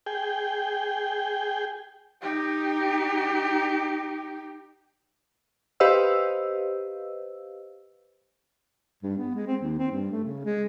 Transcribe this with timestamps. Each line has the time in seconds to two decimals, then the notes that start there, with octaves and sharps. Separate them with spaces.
0.06 G#4 G5
2.21 D#4 G4
5.80 G4 B4 C5 D#5 F5 E6
9.03 G2
9.18 B3
9.35 G#3
9.47 C4
9.61 D#2
9.78 C4
9.91 G2
10.11 A3
10.24 C#3
10.45 G#3